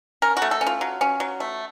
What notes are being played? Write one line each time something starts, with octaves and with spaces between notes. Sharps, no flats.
C#4 A#4
F#4
A3
A4
C#4
F4
F#3
C#4
F#3
A3